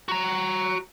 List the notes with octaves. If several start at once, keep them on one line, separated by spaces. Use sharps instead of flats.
F#4 A#5